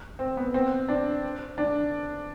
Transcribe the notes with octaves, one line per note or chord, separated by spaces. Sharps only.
C4
B3
C4
D4
D4